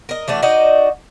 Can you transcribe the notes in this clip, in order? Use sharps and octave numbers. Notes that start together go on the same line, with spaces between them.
A#4 D#5
E3 A3 D4 F#4
D#4 F#4 D5 D#5